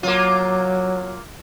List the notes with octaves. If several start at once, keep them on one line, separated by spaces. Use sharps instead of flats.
F#3 A#3 F4